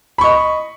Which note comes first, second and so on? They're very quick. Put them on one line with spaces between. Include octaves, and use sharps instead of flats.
B5 C#6 D#5